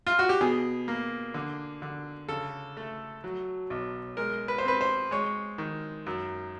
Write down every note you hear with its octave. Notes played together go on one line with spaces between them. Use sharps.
F4
F#4
G4
B2 G#4
A#3
D3
D3
C#3 A4
A3
F#3
B1
G#3 A#4
B4
C5
C4 B4
C5
G#3 C#5
D#3
F#2